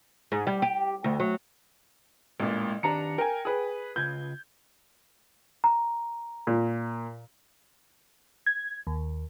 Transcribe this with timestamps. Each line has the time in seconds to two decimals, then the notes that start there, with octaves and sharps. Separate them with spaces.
0.32 G#2
0.47 G3
0.62 G4
1.04 D2
1.20 F#3
2.40 A1 A#2 G#3 E4
2.83 D#3 D4 G4 B4 A#5 C#7
3.18 A#4 G5 G#5
3.45 G#4 B4
3.96 C#3 F4 B4 G6 G#6
5.64 A#5
6.47 A#2
8.46 G#6
8.87 D#2